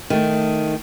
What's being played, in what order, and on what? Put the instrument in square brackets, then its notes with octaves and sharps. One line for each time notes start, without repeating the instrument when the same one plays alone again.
[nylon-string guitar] D#3 A3